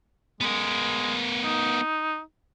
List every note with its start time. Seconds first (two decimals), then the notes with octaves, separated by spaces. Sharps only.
0.41 G#3 B3 A#4
1.44 D#4